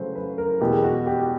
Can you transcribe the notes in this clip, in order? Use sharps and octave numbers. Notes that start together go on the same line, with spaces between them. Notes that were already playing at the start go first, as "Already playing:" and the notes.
Already playing: C#3 F#3 A3 C#4 B4 C5
B4
A#4
E2 B2 G#3 G4
F#4
G4